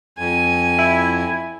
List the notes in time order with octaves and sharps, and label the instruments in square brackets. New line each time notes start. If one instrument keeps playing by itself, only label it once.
[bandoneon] F2 [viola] G#5
[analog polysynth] E4